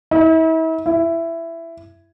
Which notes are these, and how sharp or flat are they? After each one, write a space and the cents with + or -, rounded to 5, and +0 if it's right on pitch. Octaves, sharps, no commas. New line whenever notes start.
E4 -40
E4 +15